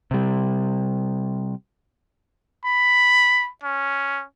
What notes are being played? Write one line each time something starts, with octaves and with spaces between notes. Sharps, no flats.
C3 G3
B5
C#4